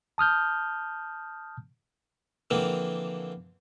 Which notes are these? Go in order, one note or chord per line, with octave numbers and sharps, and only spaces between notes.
A5 D#6 F6 G6
D3 E3 F3 A#3 C4